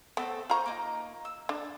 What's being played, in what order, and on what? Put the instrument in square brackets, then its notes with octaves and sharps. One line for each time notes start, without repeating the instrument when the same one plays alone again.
[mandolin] A3 C4 A4 [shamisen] B3
[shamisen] F4 A#5 [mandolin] C5 G#5 C#6
[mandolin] A#3 D#4
E6
[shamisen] D4 [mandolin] A4